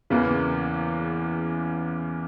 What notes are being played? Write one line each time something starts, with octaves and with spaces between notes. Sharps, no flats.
E2 C#3 E3 A#3